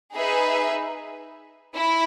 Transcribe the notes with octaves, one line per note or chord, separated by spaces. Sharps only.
D#4 G#4 B4 E5
E4